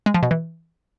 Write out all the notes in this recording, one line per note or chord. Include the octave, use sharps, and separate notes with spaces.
G#3
F3
B2
E3